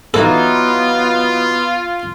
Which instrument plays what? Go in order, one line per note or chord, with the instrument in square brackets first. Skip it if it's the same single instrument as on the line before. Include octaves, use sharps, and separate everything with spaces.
[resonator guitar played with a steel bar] E3 F#3 D#4 [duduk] B3 [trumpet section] F4 [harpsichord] A4